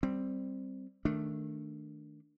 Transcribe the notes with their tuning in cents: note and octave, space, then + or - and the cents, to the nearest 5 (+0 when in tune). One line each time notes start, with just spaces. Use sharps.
G3 +0 C4 +0
D#3 +0 A3 +0 D4 +0